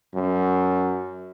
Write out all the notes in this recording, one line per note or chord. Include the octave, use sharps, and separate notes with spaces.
F#2